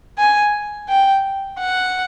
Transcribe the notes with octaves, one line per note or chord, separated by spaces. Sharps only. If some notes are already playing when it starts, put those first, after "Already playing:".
G#5
G5
F#5